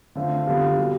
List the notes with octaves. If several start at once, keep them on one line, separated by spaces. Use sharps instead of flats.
D3 A3 C4 F4
D3 G3 B3 F4
B2 G3